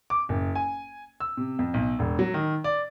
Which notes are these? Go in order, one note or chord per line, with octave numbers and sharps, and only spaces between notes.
D6
F#1
G#5
E6
C3
F2
B1
E1
F#3
D#3
D5